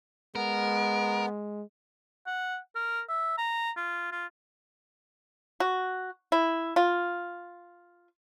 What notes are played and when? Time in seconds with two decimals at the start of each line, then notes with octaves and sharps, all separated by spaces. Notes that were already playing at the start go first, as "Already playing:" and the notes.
0.35 G#3 B3 A#4
2.27 F#5
2.75 A#4
3.09 E5
3.38 A#5
3.77 F4
4.12 F4
5.60 F#4
6.32 E4
6.76 F4